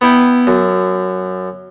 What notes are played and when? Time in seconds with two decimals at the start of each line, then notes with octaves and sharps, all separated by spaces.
0.01 B3 E4 G5
0.47 F#2